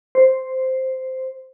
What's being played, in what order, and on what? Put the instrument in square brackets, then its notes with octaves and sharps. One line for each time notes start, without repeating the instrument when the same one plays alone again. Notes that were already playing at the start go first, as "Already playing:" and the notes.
[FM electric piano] C5